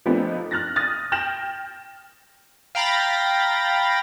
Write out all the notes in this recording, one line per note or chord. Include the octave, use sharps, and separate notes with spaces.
F3 A3 B3 C4 D4 D#4
F6 F#6 A6 A#6
D#6 F6 A6 A#6
G5 F6 G6 A#6 E7 F#7
F5 G5 A#5 B5 A6 A#6